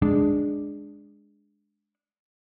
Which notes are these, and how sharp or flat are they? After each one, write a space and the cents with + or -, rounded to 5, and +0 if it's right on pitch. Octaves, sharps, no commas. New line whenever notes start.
G#3 +0 D4 +0